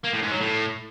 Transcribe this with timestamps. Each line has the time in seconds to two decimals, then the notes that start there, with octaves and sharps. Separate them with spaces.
0.04 A#3
0.13 A2
0.22 G#2
0.31 F#3
0.41 A2